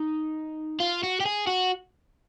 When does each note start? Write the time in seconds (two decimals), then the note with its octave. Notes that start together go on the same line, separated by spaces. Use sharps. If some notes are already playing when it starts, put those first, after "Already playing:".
Already playing: D#4
0.80 F4
1.03 F#4
1.20 G4
1.25 G#4
1.47 F#4